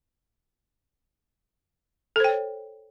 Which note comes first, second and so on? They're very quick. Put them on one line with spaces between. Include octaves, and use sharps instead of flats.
A4 C5 G5 C#5